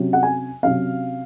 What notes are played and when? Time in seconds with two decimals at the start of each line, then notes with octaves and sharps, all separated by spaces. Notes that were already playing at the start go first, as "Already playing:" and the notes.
Already playing: C3 F#3 C#4
0.13 F#5
0.23 G#5
0.63 C3 F#3 C#4 F5